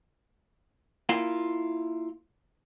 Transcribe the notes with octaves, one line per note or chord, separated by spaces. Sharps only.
A#3 E4 F4